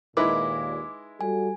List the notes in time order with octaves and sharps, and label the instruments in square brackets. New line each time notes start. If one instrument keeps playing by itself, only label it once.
[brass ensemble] D#2 A#2 [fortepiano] G#3 E4 [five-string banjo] D#4 B4 [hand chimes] D6
[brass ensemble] G3 F#4 A4 [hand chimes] G#5